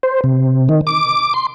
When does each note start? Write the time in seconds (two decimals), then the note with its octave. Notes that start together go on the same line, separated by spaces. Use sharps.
0.03 C5
0.24 C3
0.69 D#3
0.87 D6
1.34 C6